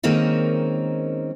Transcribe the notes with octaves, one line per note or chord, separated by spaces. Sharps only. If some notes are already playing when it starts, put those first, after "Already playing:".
D#3 G#3 A#3 C4 C#4 D#4